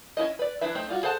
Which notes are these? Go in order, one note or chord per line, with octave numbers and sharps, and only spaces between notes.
C#4 D4 E4 D#5
B4 D5
E3 D4 E4 B4 E5
A3 C4 D#4 G4
G3 F4 F#4
G#4 A4 C5 F#5 A5